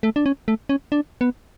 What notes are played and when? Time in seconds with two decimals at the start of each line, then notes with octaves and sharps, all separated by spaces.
0.03 A3
0.16 D4
0.26 C#4
0.48 A3
0.69 C#4
0.92 D4
1.21 B3